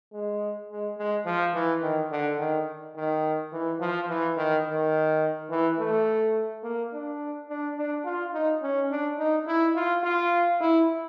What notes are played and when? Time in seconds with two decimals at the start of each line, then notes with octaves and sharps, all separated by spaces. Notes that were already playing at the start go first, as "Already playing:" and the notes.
0.13 G#3
0.69 G#3
0.98 G#3
1.25 F3
1.54 E3
1.83 D#3
2.11 D3
2.39 D#3
2.96 D#3
3.52 E3
3.81 F3
4.09 E3
4.37 D#3
4.66 D#3
5.50 E3
5.79 A3
6.63 A#3
6.93 D4
7.49 D4
7.77 D4
8.05 F4
8.33 D#4
8.62 C#4
8.91 D4
9.18 D#4
9.47 E4
9.76 F4
10.04 F4
10.61 E4